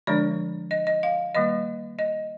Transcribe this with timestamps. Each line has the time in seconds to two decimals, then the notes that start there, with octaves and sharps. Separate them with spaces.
0.07 D3 F3 G#3 D4 D5
0.71 D#5
0.87 D#5
1.03 F5
1.35 D#3 G3 A#3 D#5
1.99 D#5